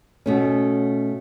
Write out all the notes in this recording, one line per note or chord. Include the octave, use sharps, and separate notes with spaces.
B2 A3 C#4